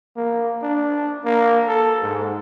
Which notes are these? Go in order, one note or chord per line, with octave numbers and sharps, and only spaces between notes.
A#3
D4
A#3
A4
G#2